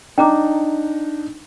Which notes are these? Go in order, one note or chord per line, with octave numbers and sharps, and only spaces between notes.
D4 D#4 G5 A#5 D6